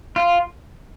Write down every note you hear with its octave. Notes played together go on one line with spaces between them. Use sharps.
F4